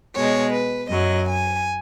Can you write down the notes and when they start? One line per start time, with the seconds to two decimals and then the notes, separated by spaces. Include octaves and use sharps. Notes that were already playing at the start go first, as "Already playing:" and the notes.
0.15 B2 G#3 C#5
0.52 B4
0.90 F#2 F#3 D#5
1.27 G#5